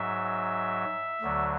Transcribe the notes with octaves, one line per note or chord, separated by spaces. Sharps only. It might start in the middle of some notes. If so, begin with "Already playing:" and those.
Already playing: G#2 F#3 E5
D2 D3 F#3